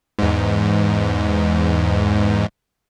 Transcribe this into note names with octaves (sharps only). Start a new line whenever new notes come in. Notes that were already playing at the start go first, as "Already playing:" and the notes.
E2 G#2